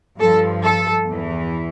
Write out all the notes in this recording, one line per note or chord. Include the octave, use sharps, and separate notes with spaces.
G2 F3 A4
A4
E2 E3